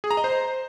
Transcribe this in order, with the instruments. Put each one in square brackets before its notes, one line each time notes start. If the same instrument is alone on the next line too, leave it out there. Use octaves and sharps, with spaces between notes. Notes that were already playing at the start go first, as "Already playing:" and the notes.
[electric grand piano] G#4
A#5
D#5
C5